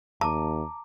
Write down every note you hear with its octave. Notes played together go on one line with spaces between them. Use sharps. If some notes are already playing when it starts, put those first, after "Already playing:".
D#2 A5 A#5 D6